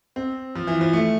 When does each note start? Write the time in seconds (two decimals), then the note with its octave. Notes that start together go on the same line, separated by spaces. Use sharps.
0.16 C4
0.55 F3
0.67 E3
0.81 F3
0.93 A3